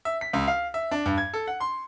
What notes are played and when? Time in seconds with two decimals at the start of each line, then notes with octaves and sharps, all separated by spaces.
0.05 E5
0.21 B6
0.33 C#2
0.48 F5
0.74 E5
0.91 D4
1.06 G2
1.18 G#6
1.34 A4
1.48 F#5
1.60 C6